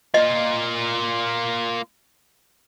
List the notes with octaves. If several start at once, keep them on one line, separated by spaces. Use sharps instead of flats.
A#3 F4 D#5